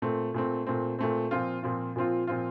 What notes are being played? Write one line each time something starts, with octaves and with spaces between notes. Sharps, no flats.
A#2 A3 C4
A#2 A3 C4
A#2 A3 C4
A#2 A3 C4
A#2 F3 C4 F4
A#2 F3 C4 F4
A#2 F3 C4 F4
A#2 F3 C4 F4